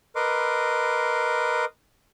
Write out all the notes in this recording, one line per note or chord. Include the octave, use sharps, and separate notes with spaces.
A#4 B4 D#5 C6 D6